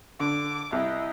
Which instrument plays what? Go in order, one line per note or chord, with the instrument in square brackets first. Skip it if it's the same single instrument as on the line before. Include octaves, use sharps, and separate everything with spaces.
[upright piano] D3 [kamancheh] D6
[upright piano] C2 [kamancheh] E4 D#5